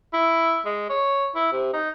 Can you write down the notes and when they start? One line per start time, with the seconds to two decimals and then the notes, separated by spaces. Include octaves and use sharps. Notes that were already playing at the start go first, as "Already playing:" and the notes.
0.13 E4
0.65 G#3
0.90 C#5
1.35 E4
1.52 C3
1.73 D#4